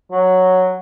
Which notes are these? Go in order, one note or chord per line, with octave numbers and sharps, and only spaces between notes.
F#3